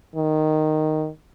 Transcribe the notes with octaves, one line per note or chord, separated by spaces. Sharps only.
D#3